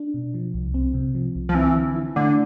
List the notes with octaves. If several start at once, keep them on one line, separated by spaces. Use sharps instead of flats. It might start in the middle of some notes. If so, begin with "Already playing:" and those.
Already playing: D4
B2
F3
C2
C4
C3
F3
C2
F3
E3 C4
D3
E4
D3 A3